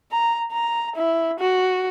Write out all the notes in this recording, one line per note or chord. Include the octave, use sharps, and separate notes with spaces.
A#5
A#5
E4
F#4